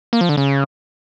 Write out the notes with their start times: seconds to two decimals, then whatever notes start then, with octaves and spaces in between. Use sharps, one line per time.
0.13 A#3
0.21 F3
0.29 D3
0.37 C#3